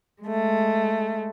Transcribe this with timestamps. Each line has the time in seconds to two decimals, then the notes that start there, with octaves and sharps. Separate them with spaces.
0.22 G#3 A3